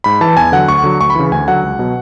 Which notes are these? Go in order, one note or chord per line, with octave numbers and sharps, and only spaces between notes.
G#2 B5
E3 A5
E2 G#5
D3 F#3 F#5
D2 C#6
D3 F#3
D2 C#6
B5
C#3 E3
D2 G#5
D3 F#3 F#5
C#2
B2 F#3